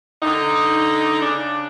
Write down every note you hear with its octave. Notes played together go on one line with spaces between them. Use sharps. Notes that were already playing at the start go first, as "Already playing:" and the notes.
D3 D#4
C#3 D4